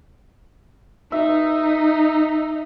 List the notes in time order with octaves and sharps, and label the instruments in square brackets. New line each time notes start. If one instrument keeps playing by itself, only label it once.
[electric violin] D#4 [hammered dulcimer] E5